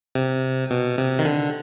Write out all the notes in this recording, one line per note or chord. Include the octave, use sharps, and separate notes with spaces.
C3
B2
C3
D#3
D3